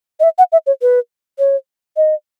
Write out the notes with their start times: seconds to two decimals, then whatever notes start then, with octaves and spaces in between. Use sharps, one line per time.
0.20 D#5
0.23 E5
0.38 F#5
0.52 E5
0.67 C#5
0.82 B4
1.39 C#5
1.97 D#5